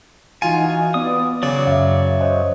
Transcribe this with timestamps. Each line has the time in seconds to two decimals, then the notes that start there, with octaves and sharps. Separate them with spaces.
0.42 E3 D#4 F4 F#4 G#5
0.94 B3 D5 D#6
1.43 C#3 F#3 D5 D6
1.67 F#2 E5 F5
2.21 C5 C#5 D#5